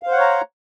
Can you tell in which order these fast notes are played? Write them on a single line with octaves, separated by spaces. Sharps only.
F5 C5 F#5 C#5 A#5